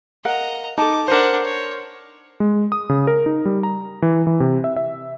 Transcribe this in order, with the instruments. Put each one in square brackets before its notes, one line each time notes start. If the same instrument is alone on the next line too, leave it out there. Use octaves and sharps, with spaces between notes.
[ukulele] A#4 F5 F#5 [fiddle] D#5 A#5
[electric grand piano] D#4 [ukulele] A4 A5 [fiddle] D6
[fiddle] D4 F#5 [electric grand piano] A#4 C5
[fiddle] C#5
[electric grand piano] G#3
D#6
C#3
A#4
D#4
G3
A#5
E3
E3
C3
E5
E5